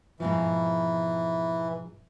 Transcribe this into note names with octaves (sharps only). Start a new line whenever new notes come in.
G#2 B2 E3 F3